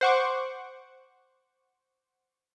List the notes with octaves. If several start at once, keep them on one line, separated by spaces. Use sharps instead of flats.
C5 F#5 C#6 D6